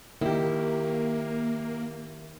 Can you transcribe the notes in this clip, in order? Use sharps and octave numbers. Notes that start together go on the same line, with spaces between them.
D#3 A#3 E4 G4